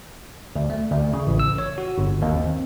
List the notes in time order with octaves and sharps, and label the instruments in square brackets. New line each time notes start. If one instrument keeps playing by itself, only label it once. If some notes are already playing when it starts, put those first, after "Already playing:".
[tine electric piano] D2
A3
D2
C#3
A1
E6
C#5
F#4
G1
D#2
C4